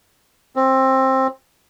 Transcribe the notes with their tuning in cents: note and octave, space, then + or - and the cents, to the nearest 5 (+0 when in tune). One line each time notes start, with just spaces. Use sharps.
C4 +15